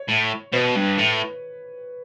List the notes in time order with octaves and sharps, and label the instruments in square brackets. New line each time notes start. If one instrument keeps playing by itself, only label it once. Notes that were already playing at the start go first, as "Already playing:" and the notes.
Already playing: [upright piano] C#5
[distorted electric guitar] A2
[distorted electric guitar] B2 [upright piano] B4
[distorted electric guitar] G2
A2